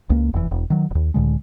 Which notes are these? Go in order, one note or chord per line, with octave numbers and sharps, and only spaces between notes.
C#2 A#3
F1 E2 G2 E3
E1
D#3 F#3
D#1 D#2
C#2 A2 D3 G#3